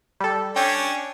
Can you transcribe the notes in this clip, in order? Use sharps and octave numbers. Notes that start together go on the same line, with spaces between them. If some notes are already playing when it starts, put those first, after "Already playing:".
G3 A4
C#4 D4 G5